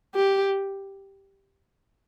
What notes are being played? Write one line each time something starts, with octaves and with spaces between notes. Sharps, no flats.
G4